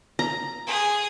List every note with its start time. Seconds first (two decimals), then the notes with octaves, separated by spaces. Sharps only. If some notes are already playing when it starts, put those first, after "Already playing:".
0.19 A#5
0.67 G#4 D#6